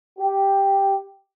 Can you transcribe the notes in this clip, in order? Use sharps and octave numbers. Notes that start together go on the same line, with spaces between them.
G4